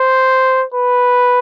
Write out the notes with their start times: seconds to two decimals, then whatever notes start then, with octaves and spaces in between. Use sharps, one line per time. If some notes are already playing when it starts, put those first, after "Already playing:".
Already playing: C5
0.74 B4